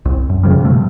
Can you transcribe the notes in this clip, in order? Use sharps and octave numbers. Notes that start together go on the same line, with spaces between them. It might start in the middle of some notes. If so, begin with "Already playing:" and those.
C2
F#2
F#2 C#3 F3 G3
B2 F3 A3
G2